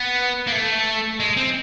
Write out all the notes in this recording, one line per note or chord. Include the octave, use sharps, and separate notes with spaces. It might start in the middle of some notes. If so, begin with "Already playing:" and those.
Already playing: B3
A#3
A3
G#3
C4